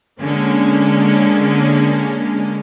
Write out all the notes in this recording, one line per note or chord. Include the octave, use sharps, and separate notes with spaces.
D3 G#3 A#3 C#4